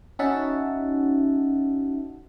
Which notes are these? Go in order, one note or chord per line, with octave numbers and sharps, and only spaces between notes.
C#4 D#4 F#4 E5 F#5 A5